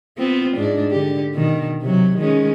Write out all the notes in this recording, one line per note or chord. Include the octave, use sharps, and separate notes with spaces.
B3 C4 F4
G#2 D4
D3 G4
B2 D#3
C3 F#3
D#3 G#3 C#4